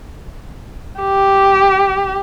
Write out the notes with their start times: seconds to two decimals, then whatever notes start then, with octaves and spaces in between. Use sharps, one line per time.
1.00 G4